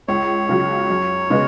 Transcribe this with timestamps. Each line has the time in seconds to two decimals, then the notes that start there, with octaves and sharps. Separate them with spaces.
0.08 C#2 C#5
0.49 C#3 F#3
0.90 F#2
1.30 C#3 G#3 B3